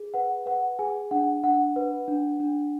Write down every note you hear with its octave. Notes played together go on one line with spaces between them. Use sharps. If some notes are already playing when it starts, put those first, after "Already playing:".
Already playing: G#4
B4 F#5
B4 F#5
G#4 G#5
D4 F#5
D4 F#5
B4
D4
D4